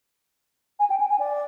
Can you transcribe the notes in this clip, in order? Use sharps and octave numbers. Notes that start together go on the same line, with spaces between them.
G#5
G5
G#5
G#5
D5